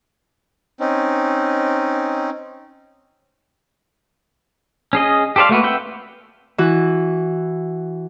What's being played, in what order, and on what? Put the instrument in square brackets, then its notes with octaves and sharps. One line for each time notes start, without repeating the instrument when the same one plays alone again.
[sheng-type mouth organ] C4 C#4 D#4
[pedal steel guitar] C#4 G#4 D#5
G4 A4 C5 D5 F5
A3 A#3 F#4 B4
C4 B4 E5 F#5 G5
[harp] E3 F#4